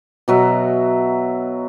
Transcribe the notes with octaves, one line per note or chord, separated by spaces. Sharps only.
B2 F#3 E5